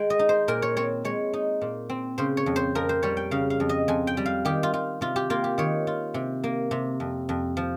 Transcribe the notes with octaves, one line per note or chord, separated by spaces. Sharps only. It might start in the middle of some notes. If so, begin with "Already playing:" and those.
Already playing: G#3 G5
D#5
D#4
C5
A#2 A#4
C#5
C4 C#5
G#3 C#5
D#4
A#2
C4
C#3 C5
C#5
F2
C5
F2 A#4
C5
G3 C#5
G5
C#3 F5
F5
F2
D#5
F2 G#5
G5
G3
F5
D#3 G4
F4
F4
C3 F4
G4
A#3 F4
G4
D#3 C#5
F4
C3
A#3
C3
F2
F2
F3